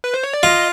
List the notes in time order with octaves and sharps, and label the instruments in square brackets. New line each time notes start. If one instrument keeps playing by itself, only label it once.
[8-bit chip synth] B4
C5
C#5
D5
[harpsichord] F4 [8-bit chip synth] D#5